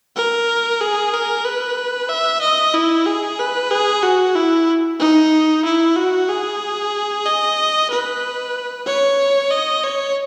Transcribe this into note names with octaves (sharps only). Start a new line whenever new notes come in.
A#4
G#4
A#4
B4
E5
D#5
E4
G#4
B4
G#4
F#4
E4
D#4
E4
F#4
G#4
D#5
B4
C#5
D#5
C#5